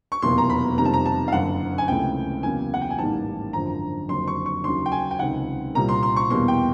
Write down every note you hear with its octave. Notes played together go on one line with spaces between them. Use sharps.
C#6
F1 E2 B2 F#3 A#3 C6
A#5
B5
F2 C3 D#3 G3 A#3 A#5
A5
A#5
A5
F5
F#1 F#2 D3 F#5
G#5
C#2 C3 E3 A3 G5
E2 C#3 F#3 A#3 G#5
F#5
G5
G#5
A1 G#2 D#3 G3 A#3 A5
G#1 F#2 D3 F3 A#5
F#1 F2 D3 F#3 C6
C#6
C#6
D#2 C#3 F#3 C6
G5
G#5
G5
C#2 C3 D#3 F#5
C2 A#2 G3 A#3 A#5
C6
C6
C#6
E2 B2 G3 A#3 C6
G5